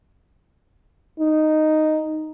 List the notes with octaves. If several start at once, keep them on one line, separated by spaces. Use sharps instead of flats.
D#4